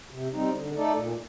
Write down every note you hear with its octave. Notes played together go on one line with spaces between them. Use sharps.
C3
G3 C4 D#4
D3
A3 D#4 A4 D5
A#2